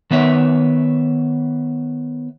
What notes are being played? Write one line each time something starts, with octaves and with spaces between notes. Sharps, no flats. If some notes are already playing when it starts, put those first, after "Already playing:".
D#3 B3 C#5 E5